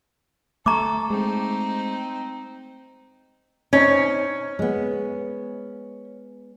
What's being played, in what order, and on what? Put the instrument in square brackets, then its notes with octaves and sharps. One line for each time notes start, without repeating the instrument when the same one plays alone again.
[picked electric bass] A3 [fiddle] A4 [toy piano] A#5 C#6 D6
[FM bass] G#3 [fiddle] C4 D#4
[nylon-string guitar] C4 D#4 [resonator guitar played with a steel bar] C#4
[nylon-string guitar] G#3 B3